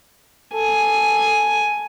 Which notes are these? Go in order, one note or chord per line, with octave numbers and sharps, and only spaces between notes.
A4 G#5